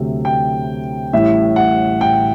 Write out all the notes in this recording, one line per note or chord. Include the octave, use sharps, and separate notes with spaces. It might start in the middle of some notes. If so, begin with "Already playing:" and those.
Already playing: D2 C3 F#3 A3
G5
A1 A2 G3 E5
F#5
G5